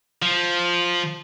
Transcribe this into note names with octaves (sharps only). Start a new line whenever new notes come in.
F3